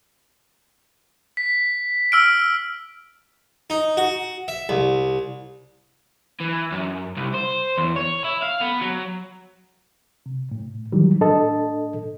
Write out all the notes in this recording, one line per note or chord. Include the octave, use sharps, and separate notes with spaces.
B6
E6 F6 D7
D#4
F#4
E5
C2
E3
F#2
C2
C5
E2
C#5
E4
F5
B3
F#3
C3
A2
D#3 E3 F#3 G3
A2 D4 A4 D#5 A5